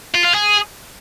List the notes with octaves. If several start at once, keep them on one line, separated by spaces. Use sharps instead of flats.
F4
F4
G#4